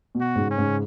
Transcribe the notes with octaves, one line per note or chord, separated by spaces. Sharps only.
B2
F#4
G#2 C#3
C#4
G#2 C#3